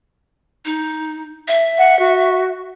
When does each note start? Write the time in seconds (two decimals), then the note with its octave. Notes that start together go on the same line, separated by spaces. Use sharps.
0.65 D#4
1.48 E5
1.78 F#5
1.99 F#4